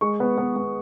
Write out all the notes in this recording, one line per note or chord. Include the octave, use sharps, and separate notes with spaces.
G#3 C#6
B3
B3
B3